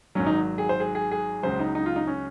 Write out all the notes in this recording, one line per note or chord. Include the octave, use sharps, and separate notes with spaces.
G#1 G#2 F#3 C#4
D#4
G#4
C5
G#4
G#4
G#4
C#2 C#3 F#3 C5
D#4
D#4
F4
D#4
C#4